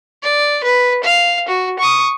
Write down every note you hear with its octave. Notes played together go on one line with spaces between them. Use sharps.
D5
B4
F5
F#4
C#6 D#6